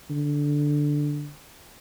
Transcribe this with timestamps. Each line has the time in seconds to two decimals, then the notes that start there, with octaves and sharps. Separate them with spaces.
0.10 D3